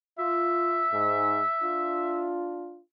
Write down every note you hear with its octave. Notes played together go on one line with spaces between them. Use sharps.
F4 E5
G#2
D4 F4